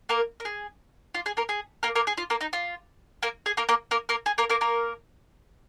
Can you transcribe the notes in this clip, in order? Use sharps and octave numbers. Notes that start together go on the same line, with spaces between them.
A#3 A#4
A#4
G#4
F4
G#4
A#3 A#4
G#4
A#3 A#4
A#3 A#4
G#4
F4
A#3 A#4
D#4
F4
A#3 A#4
G#4
A#3 A#4
A#3 A#4
A#3 A#4
A#3 A#4
G#4
A#3 A#4
A#3 A#4
A#3 A#4